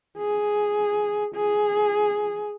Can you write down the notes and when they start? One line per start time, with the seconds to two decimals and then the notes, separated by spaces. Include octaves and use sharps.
0.19 G#4
1.35 G#4